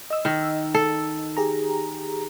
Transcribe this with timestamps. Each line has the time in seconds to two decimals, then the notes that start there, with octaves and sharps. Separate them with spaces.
0.10 D#5 E6
0.25 D#3
0.74 A4
1.37 G4 G#4 A#5